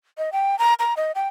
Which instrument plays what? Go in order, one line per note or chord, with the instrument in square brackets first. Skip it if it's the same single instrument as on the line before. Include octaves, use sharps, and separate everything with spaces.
[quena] D#5
G5
A#5
A#5
D#5
G5